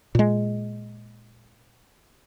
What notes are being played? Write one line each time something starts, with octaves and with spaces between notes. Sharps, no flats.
A#2 G#3